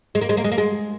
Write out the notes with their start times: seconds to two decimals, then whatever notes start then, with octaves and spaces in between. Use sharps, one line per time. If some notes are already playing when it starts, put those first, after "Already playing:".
0.15 G#3
0.21 A#3
0.29 G#3
0.37 A#3
0.44 G#3
0.52 A#3
0.58 G#3